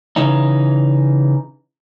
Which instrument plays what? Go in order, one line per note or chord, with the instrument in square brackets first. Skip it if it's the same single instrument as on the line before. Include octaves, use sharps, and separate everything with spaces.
[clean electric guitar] C#3 E3 C#4 D#4